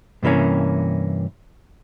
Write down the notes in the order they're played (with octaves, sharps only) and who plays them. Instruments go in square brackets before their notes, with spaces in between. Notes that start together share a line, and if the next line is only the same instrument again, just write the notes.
[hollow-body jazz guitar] G2 C3 E3 A#3 C#4